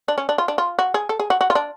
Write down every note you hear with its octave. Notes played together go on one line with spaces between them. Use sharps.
D4
C#4
D4
F4
D4
F4
F#4
G#4
A4
G#4
F#4
F#4
F4
D4